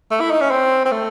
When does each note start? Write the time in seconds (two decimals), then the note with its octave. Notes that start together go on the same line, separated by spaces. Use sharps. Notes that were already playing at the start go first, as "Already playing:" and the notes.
0.11 A3
0.20 E4
0.31 D#4
0.41 C#4
0.51 C4
0.85 C4
0.92 A3